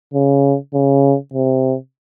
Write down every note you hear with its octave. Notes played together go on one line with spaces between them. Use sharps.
C#3
C#3
C3